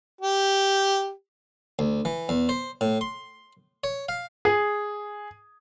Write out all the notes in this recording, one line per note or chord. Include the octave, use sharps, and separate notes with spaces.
G4
D2
E3
E2
C5
A2
C6
C#5
F5
G#4